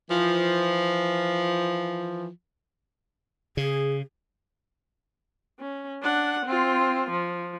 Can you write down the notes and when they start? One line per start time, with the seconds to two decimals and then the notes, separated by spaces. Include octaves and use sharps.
0.10 E3 F3
3.57 C#3 G#4
5.59 C#4
6.02 D4 F#5
6.46 C4 F4
7.10 F3